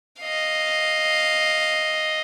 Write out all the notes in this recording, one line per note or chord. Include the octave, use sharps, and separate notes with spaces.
D#5 F5